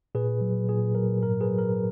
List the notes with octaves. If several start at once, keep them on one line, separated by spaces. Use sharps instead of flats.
A#2 G#4 B4
F#3
A#2 G#4
F#3 A#4
G#2 A#4
G#4 B4
F#3
A#4